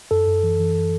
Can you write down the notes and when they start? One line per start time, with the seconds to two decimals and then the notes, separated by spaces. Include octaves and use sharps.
0.11 F#2 A4
0.27 F#2
0.43 E3
0.60 E3